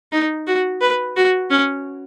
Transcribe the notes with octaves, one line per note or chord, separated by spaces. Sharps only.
D#4
F#4
B4
F#4
C#4